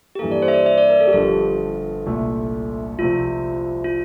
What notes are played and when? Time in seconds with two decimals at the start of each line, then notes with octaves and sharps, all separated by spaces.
0.15 G4
0.19 G2 E3 A#3 A4
0.32 D5
0.42 C5
0.48 E5
0.54 D5
0.66 E5
0.78 D5
0.90 A#4
1.01 A4
1.07 G4
1.13 G1 G2 F3 A4
2.06 C2 A#2 A3
2.99 C2 C3 F3 A3 F4
3.84 F4